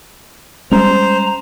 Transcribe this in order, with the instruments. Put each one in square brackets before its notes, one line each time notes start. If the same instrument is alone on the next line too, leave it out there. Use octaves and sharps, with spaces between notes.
[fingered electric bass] G3 G#3 C#4 [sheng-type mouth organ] C5 [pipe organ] A#5